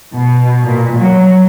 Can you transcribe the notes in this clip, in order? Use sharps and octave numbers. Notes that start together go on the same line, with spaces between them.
B2
A#2
F#3